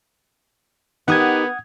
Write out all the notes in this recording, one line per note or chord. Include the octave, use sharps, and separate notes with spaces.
B3 D#4 G4 A#4 F#5 D#6 G#6